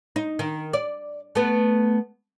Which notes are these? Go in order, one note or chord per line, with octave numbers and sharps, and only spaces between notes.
D#4
D#3
D5
A3 B3